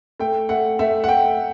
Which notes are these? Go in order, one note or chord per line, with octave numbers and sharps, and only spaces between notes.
A3 G5
A3 F#5
A3 E5
F#5
A3 G5